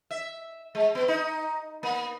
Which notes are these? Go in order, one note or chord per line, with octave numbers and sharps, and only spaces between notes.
E5
G#3
B3
D#4
A#3